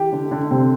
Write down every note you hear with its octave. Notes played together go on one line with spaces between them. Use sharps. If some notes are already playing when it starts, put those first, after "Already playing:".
Already playing: E3 G4
D3
D3
C3 C4